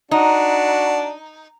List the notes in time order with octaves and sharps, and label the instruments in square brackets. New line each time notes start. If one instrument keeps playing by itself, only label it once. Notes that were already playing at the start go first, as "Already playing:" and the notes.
[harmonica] D4 F#4 [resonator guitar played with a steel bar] D#4